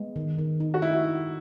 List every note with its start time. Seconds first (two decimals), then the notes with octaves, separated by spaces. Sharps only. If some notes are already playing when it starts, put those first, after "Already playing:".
Already playing: G#3 B3
0.16 D#3
0.39 D#3
0.60 D#4
0.74 F#4
0.82 D#4 E4